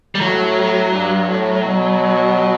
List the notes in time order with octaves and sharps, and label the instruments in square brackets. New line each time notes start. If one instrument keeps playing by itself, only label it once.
[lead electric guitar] G3
[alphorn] A2 [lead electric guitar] F#3
[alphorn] G2
A2
B2